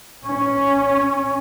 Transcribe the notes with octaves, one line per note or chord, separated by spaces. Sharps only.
C#4